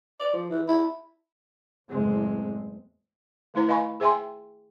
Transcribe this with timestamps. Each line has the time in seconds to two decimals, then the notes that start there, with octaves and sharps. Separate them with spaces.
0.20 D5
0.33 F3
0.50 E3
0.68 E4
1.88 F#1 E2 A2 G#3 C4
3.54 D#3 A3 E4 C5 A#5
3.68 B4 D#5 F5 G#5 B5 C#6
4.00 G#4 C5 E5 G5 G#5 C6